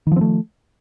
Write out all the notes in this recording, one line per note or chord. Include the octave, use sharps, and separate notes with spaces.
D#3 F3 A3 C4